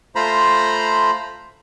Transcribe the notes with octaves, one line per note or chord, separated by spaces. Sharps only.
A3 F4 C5 A#5 B5